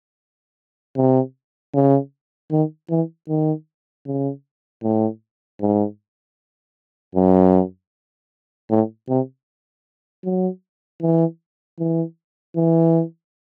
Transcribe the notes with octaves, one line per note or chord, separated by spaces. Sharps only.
C3
C#3
D#3
E3
D#3
C#3
A2
G#2
F#2
A2
C3
F#3
E3
E3
E3